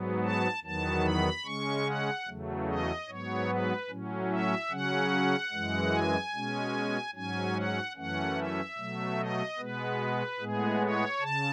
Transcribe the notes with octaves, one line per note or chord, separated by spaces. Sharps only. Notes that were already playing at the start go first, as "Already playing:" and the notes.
Already playing: G#2 F#3 B3
A5
E2 D#3 F#3 B3 A5
B5
C#3 G#3 C#4 C#6
F#5
E2 C#3 F#3 A3
D#5
G#2 F#3 B3 C#5
B4
A2 F#3 C#4
E5
C#3 F#3 C#4 F#5
F#2 E3 G#3
G#5
B2 G#3 C#4
G#2 F#3 C#4 G#5
F#5
F#2 E3 A3 C#4 F#5
E5
B2 F#3 A3
D#5
B2 G#3 B3 B4
A2 G#3 B3 G#4
C#5
C#3 A5